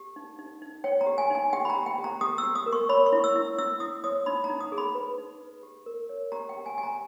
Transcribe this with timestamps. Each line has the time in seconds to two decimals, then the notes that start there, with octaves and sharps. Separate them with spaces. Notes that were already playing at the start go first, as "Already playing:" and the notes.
Already playing: G4
0.16 D#4
0.39 D#4
0.62 D#4
0.84 C#5 G5
1.01 A#5
1.07 G4
1.18 G#5
1.30 D#4 G#5
1.53 G4 G5
1.65 B5
1.70 A#5
1.75 G4
1.86 G5
1.98 G4
2.04 A#5
2.21 G4 D#6
2.38 E6
2.43 G4
2.55 D#6
2.66 A#4
2.73 C#6
2.89 C#5 B5
3.06 C#6
3.13 E4
3.24 E6
3.35 E4
3.58 E4 E6
3.80 E4 D#6
4.04 C#5 D#6
4.26 D#4 B5
4.44 A#5
4.50 D#4
4.60 D#6
4.72 G#4
4.78 B5
4.95 B4
5.18 D#4
5.41 B4
5.63 G4
5.86 A#4
6.09 C#5
6.32 G4 A#5
6.49 G5
6.55 G4
6.66 G#5
6.77 G4 G#5
6.83 A#5